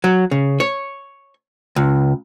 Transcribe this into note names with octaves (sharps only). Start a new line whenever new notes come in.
F#3
C#3
C#5
C#2